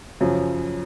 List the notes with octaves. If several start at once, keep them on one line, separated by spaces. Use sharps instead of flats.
F#2 C#3 F3